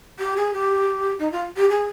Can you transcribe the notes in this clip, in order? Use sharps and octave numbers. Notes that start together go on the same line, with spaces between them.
G4
G#4
G4
D#4
F4
G4
G#4